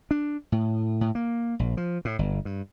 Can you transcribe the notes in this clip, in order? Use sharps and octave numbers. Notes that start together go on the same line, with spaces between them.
D4
A2
A2
A#3
A#1
F3
A2
G1
G2